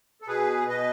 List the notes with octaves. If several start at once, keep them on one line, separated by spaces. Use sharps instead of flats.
A4
B2 G#4 B4
B2 B4 D#5